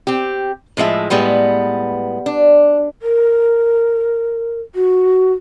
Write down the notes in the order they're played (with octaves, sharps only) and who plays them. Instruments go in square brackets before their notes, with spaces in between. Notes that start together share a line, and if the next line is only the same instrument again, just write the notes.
[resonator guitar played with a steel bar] C4 G4
A2 F3 G#3 E5
A2 G3 G#3 B3 B4
D4
[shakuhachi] A#4
F#4